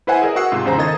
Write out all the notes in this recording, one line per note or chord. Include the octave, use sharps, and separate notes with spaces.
E4 B4 C5 E5 F#5 G#5
G#4 A#4 D#5
F#4 F#5 E6 C7
G#2 C3 F4
E2 C#3 C5 A#5
D#3 D#4 A4 D#5 G#6 A6